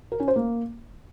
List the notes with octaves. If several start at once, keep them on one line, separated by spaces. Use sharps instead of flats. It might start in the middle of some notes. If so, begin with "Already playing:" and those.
A#4
C#4
C5
A#3